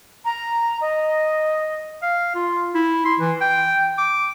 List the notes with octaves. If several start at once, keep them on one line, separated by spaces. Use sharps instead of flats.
A#5
D#5
F5
F4
E4
C6
E3
G5
D6